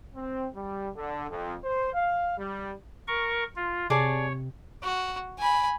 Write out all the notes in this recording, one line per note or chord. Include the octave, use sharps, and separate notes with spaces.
C4
G3
D3
F2
C5
F5
G3
A#4 C#6
F4
C3 G#4 C#5 D5 A5
F#4
G#5 B5